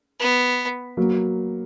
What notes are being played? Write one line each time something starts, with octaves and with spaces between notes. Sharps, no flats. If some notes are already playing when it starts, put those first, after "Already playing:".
B3
F#3 A#3